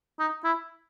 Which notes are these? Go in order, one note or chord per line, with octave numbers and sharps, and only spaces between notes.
D#4
E4